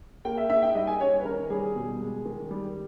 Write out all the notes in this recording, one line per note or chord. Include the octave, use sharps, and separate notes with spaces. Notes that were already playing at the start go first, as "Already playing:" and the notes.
A#3 G5
E5
D#4 E5
G5
G3 D#5
G#5
C#4 C#5
B4
D#3 A#4
G3 G#4
B2
G#3
D#3
G3